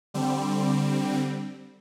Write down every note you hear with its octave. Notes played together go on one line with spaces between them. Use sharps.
D3 G3 C4